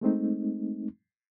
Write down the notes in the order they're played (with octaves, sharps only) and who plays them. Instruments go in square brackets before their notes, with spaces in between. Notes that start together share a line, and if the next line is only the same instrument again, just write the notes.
[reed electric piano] G#3 A3 C4 D#4